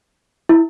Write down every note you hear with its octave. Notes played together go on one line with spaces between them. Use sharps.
E4